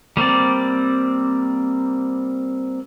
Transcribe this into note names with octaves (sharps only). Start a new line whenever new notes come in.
G3 A#3 C4 D5